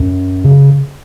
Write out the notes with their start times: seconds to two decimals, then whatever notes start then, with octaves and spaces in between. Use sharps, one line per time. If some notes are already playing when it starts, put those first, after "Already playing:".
Already playing: F#2
0.44 C#3